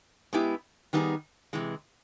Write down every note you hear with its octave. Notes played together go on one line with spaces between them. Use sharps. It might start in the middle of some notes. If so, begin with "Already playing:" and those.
G#3 B3 E4 G4
D#3 G3 B3 D#4 G#4
C3 E3 G#3